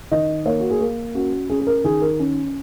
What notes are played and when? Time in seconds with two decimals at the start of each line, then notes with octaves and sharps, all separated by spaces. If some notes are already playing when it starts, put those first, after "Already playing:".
0.11 D#3 D#5
0.46 A#3 C#5
0.60 F#4
0.71 G#4
0.80 A#3 A#4
1.15 C#4 F#4
1.50 C#4 G#4
1.60 G#4
1.67 A#4
1.84 D#3 G#4
2.02 A#4
2.19 C#4